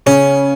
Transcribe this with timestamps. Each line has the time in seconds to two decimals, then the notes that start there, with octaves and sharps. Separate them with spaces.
0.06 C#3 C#4